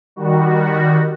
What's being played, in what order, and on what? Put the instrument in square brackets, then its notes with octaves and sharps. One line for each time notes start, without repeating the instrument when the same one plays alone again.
[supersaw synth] D#3 G3 F#4